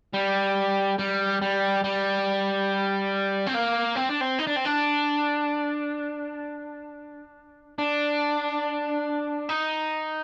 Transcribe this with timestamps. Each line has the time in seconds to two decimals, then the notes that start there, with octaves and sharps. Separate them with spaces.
0.14 G3
0.99 G3
1.42 G3
1.84 G3
3.47 C4
3.55 A#3
3.96 C4
4.09 D4
4.21 C4
4.39 D#4
4.47 D4
4.57 C4
4.66 D4
7.78 D4
9.49 D#4